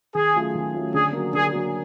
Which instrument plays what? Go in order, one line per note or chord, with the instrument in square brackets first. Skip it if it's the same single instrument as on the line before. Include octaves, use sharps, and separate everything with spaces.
[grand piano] D#3 [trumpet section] G#4
[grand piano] F#3 A3 C#4 F4
D#3
F#3 A3 C#4 F4
[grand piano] D3 [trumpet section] G#4
[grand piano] F#3 A#3
[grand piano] D3 [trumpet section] G#4
[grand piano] F#3 A#3